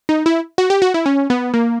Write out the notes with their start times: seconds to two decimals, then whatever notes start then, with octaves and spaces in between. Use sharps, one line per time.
0.09 D#4
0.26 E4
0.58 F#4
0.70 G4
0.82 F#4
0.94 E4
1.06 C#4
1.30 B3
1.54 A#3